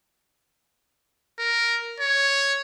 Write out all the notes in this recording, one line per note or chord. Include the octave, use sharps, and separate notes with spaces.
A#4
C#5